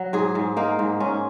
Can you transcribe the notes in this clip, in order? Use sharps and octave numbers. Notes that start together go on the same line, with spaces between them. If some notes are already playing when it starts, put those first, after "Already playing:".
Already playing: F#3
G#2 G#4
G#2
A#3 D#4
G#2
G#2 C#4